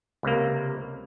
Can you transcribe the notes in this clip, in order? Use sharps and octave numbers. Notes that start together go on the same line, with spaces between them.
C#2 C3 A#3